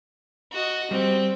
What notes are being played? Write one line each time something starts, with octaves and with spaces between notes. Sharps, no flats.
F#4 D#5
G3 C4